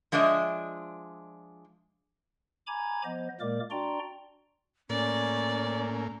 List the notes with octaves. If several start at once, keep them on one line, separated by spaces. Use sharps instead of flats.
F3 G#3 D4 D#5 E5
G#5 A#5 B5 D6 G#6
F3 B3 C5 D#5
A#2 G#3 A#3 A#4 D5 D6
D4 F#4 D5 G5 A#5 C6
A2 A#3 C#4 D5